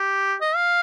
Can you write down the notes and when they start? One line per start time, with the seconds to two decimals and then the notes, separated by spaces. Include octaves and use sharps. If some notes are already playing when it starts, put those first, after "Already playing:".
Already playing: G4
0.41 D#5
0.56 F5